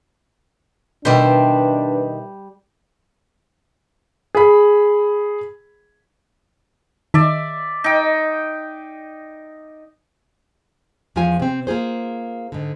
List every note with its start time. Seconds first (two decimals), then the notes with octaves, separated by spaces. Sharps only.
1.05 B2 D#3 G3 D4 B4 C5 E5
4.35 G#4 B5
7.14 D#3 D5 E5
7.84 D#4 G5
11.16 E2 F3 G#3 F4 G#5
11.40 C3 C4
11.67 A#3 F4 G#4 C5
12.52 G#2 D3